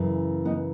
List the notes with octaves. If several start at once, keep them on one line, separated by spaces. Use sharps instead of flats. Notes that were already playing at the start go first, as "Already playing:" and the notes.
Already playing: F#2 C#3 E3
B3 D#4